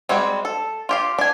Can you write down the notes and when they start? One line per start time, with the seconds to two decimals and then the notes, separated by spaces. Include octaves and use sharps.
0.09 G3 G#3 C4 F#4
0.45 A4
0.89 F4 G4 F5
1.18 D4 G#5